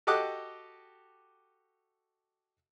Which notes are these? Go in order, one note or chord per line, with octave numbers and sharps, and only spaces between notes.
F#4 G4 A4 D#5 D6 F#6